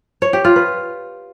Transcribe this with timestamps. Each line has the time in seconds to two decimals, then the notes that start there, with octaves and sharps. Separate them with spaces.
0.22 C#5
0.33 G4
0.45 F4
0.56 B4